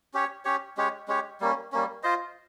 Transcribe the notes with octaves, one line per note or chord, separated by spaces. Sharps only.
C#4 G4 C#5
C#4 G4 C#5
G#3 C#4 G4 C#5
G#3 C#4 G4 C#5
G3 A#3 C#4
G3 A#3 C#4
F4 C5 D#5